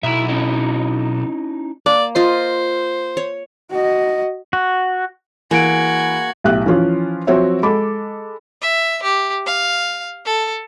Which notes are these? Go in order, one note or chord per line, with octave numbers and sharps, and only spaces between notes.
B1 E4 E5
C#4 D#4 E4
A#3 D5
F4 C5 D#5
C#5
F#4 D#5
F#4
E3 A#3 F#4 G#4 G#5 G#6 D7
B1 A2 G4 E5 F#6
E3 F3 C#4 F4
F3 F#3 C4 F#4 C#5 E5
G#3 A4 B5 D6
E5
G4
F5
A4